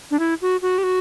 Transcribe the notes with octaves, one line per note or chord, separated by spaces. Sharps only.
D4
E4
F#4
F#4
G4
F#4